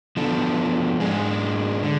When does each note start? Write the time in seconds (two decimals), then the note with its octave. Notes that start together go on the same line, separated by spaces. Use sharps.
0.17 F3 B3 D4 A4
1.00 G#2 G#3 D4 G#4
1.83 D3